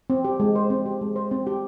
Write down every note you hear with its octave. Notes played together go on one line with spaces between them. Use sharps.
C4
G4
G#3
C5
C4
G4
G#3
C5
C4
G4